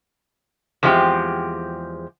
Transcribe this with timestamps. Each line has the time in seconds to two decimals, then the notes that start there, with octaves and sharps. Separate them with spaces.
0.83 E2 F3 G#3 C4 E4 G4